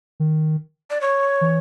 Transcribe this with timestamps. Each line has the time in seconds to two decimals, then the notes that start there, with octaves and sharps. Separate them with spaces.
0.20 D#3
0.90 D5
1.01 C#5
1.41 E3